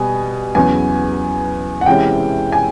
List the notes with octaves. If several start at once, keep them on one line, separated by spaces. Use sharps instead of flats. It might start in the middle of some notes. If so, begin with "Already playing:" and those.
Already playing: B2 G3 B3 G#5
E2 C#3 F#3 B3 G#5
F#5
C3 E3 G#3 C#4 G5
G#5